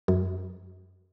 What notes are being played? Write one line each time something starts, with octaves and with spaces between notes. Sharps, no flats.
F#2